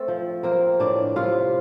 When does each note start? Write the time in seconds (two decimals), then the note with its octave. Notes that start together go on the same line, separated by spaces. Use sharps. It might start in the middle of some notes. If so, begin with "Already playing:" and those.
Already playing: A3 C4 A4
0.08 F3
0.43 A#3 C4 A#4
0.80 A2 D4 D5
1.16 C3 F4 F5